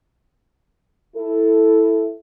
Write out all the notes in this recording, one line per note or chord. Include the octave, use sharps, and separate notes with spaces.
E4 A4